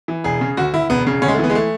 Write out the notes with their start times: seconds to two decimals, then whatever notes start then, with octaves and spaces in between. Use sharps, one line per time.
0.08 E3
0.24 E1 G#4
0.41 C#3
0.57 D2 F#4
0.74 D2 E4
0.90 E1 B3
1.07 C#3
1.22 D2 C#4
1.28 G#3
1.34 A3
1.39 E3 B3
1.50 G#3
1.55 A3